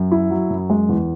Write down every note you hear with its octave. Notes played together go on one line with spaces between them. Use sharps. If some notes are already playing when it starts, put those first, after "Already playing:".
Already playing: F#2
E4
F#3
F#2
G#3
E2